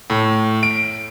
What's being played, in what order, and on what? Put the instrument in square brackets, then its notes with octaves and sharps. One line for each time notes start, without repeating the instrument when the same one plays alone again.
[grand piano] A2
D7